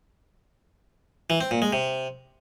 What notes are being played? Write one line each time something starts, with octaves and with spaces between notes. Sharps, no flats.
E3
C4
A#2
G#3
C3